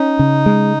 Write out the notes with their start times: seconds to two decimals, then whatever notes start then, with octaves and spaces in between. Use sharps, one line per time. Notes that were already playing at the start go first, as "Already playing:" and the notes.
Already playing: C#4 D#4
0.19 C#3
0.46 G#3